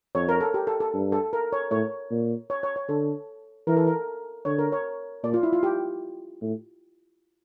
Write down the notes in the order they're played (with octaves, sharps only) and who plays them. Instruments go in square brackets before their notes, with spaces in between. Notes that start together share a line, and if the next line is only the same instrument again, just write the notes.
[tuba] F2 [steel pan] C#5
[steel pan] A#4
A4
G4
A4
A4
[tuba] G2
[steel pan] A4
A#4
C#5
[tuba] A2 [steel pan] C#5
[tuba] A#2
[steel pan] C#5
C#5
C#5
[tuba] D3 [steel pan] A4
[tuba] E3 [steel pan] A#4
[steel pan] A4
A#4
[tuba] D3 [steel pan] C#5
[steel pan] A#4
C#5
[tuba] A#2 [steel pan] D5
[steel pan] F4
E4
F4
G4
[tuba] A2